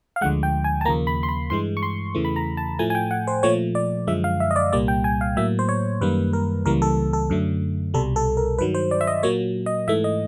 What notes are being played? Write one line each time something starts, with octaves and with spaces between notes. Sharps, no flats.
F5
D2 D3 F3 G#3 F#5
G5
G#5
A5
D#2 C#3 F3 A#3 A#5
B5
C6
B5
G2 E3 G#3 C6
C#6
C6
E2 C#3 E3 A3
B5
A#5
A5
A2 F3 A3 G#5
G#5
G5
F#5
C5
A#2 F3 A3 C#5
D5
F#2 D3 F3 G#3 E5
F5
E5
D#5
D5
C2 A#2 G3 A#3 D5
G5
G#5
F5
A2 F#3 A#3 E5
C5
C#5
F#2 D#3 G3 A#3 B4
A#4
C#2 C#3 E3 G3 A#3 A#4
A4
A4
F#2 D3 F#3 A3
C2 B2 G3 A4
A4
A#4
G2 D#3 F#3 B4
C5
D5
E5
D#5
A#2 F#3 A#3 C#5
D#5
G#2 E3 A3 E5
D#5